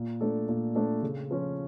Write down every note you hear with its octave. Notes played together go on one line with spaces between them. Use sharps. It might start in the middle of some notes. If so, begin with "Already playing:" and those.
Already playing: A#2
A3 D4 A4
A#2
A3 D4 A4
C#3
F3 C#4 F4